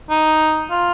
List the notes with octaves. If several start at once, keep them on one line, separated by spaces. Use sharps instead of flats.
D#4
F4